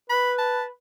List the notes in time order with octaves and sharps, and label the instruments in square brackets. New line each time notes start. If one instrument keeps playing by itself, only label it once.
[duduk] B4 [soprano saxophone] B5
[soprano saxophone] A5